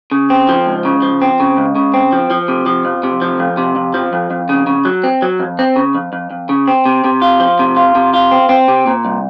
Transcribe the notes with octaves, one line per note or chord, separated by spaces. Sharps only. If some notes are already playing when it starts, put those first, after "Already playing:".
C#3
C4
F3
C#2
C#3
F3
C4
C#3
C#2
C#3
C4
F3
F3
C3
F3
F2
C3
F3
F2
C3
F2
F3
F2
F2
C#3
C#3
F#3
C4
F#3
F2
C4
C#3
F2
F2
F2
C#3
C4
C3
C3
F4
F3
C3
F4
C3
F4
C4
C4
C3
A#2
C2